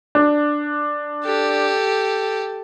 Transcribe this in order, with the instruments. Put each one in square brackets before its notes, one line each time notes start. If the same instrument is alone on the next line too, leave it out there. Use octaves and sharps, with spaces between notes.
[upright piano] D4
[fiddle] G4 A4